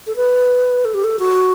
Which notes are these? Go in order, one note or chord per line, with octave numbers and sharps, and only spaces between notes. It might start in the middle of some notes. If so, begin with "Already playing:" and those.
A4
B4
A4
G4
A4
F#4